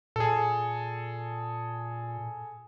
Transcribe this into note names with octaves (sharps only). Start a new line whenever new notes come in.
A#2 G#4 A4